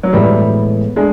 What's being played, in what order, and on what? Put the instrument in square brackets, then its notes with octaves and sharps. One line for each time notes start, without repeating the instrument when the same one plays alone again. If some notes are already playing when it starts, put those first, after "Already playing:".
[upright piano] F#3
[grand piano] A2 E3 G#3 B3 [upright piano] G3
[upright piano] G#3 [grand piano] A3 D4